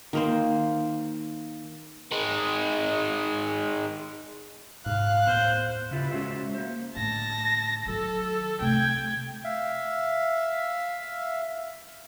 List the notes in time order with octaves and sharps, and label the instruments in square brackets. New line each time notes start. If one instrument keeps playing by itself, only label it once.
[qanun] D#3 A#3 C5
[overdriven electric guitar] D#3 G#3
[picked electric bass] G#2 C3 [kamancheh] F5 F#6
[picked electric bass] D#2 A2 B3 [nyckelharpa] C5
[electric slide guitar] C#3 E4 F4 G4 B4
G#3 C#4 F#4 G#4 C5 E5
A#3 C5
[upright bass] A2 D3 [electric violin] A5 A#6
[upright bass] D#3 F#3 [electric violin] A4
[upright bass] C3 A3 [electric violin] G5 G#6
[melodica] E5 F5